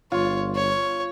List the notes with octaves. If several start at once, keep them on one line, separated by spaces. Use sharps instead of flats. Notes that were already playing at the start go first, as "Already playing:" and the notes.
G1 F4 C#5
C#5